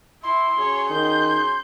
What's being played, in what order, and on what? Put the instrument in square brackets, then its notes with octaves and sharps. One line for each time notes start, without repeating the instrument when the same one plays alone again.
[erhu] E4 [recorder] C6
[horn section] F#3 C#4 G#4 [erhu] C#5
[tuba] D#3 [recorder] C6 [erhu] G6